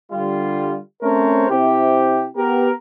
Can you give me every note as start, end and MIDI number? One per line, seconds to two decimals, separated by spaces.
0.12 0.78 50
0.12 0.78 55
0.12 0.78 65
1.03 1.50 57
1.03 1.50 60
1.03 1.50 61
1.03 1.50 70
1.03 1.50 72
1.03 1.50 73
1.51 2.28 48
1.51 2.28 60
1.51 2.28 64
1.51 2.28 67
2.37 2.71 59
2.37 2.71 67
2.37 2.71 70